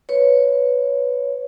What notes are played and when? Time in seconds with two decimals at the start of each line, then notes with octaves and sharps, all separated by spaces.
0.09 B4 C#5